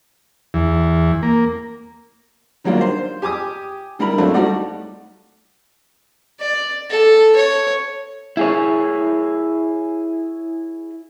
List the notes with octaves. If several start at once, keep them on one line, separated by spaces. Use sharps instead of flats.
E2
A#3
D#3 F#3 G3 A#3 D4 F4
C5
G4 G#5 D6 D#6
D3 G3 E4 A#4 B5
F#3 A3 C4 D4 E4 F4
G3 A3 D#4 F#4 D5
D5
A4
C#5
E4 G#4 C#5